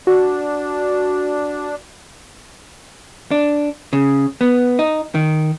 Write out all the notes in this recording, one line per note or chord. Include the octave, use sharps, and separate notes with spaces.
D4 F#4
D4
C#3
B3
D#4
D#3